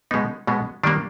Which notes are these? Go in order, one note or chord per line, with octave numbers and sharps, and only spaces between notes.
B2 G#3 B3 D#4
B2 G#3 B3
D#3 G3 A#3 D4